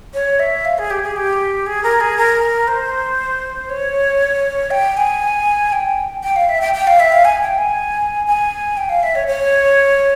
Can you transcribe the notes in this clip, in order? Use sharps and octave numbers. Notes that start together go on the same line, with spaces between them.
C#5
E5
F5
G#4
G4
G#4
G4
G#4
A#4
G#4
A#4
C5
C#5
G5
G#5
G5
G5
F5
E5
G5
G5
F5
E5
F5
G#5
G5
G#5
G#5
G5
F5
E5
C#5
C#5